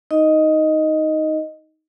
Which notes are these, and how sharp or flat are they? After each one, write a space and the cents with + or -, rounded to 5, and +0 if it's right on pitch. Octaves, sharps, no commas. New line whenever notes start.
D#4 +10 D#5 +0